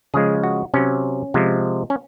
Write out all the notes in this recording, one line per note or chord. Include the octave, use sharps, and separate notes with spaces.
C#3 F3 G#3 G#4
F#4
C3 F#3 C#4
C3 F3 G#3
C#4